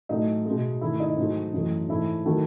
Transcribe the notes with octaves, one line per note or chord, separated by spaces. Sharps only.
A2 F#3 A3 D#4
G#3
B2
G#2 D#3 A3 E4
D#4
G#2 F#3 A3
F#2 E3 A3
G#2 E3 A3 E4
D#3 F#3 A3